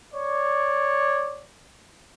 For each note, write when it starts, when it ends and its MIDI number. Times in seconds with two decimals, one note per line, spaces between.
0.14 1.43 73
0.14 1.43 74